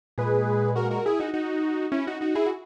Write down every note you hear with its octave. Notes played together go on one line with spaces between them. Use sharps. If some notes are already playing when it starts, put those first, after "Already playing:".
A#2 G#3 G#4 B4
F#4 A#4
F#4 A#4
E4 G#4
D#4 F#4
D#4 F#4
C#4 E4
D#4 F#4
D#4 F#4
E4 G#4
F#4